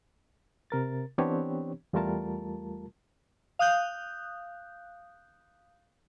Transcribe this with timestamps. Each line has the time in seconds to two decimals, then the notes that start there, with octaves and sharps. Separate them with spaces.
0.70 C3 A#4 A6
1.18 E3 B3 C4 D4 G4 C#5
1.93 E2 G3 A3 F4 A#4 A5
3.59 F5 D#6 F#6 G6